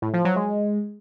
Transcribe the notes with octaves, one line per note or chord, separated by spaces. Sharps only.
A2
F3
F#3
G#3